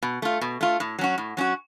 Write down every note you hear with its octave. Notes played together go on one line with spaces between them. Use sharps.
B2
A3 F4
B2
A3 F4
A2
F#3 C#4 F#4
A2
F#3 C#4 F#4